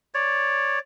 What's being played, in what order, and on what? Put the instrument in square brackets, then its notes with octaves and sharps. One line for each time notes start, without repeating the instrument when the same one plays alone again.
[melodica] C#5 D5